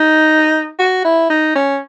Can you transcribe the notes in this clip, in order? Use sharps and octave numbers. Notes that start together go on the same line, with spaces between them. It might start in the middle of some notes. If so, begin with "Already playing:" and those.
Already playing: D#4
F#4
E4
D#4
C#4